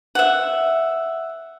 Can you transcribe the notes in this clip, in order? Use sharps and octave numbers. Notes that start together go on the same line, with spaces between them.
E5 F#5